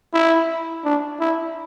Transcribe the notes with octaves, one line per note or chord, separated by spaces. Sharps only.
E4
D4
E4